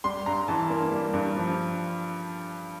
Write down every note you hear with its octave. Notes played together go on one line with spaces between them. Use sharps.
G3 C6
G2 A#5
E3 A5
A#3
G3
G2
F3